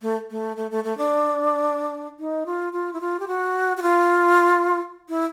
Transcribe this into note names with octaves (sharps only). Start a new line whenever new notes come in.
A3
A3
A3
A3
A3
D4
D#4
F4
F4
E4
F4
G4
F#4
F#4
F4
E4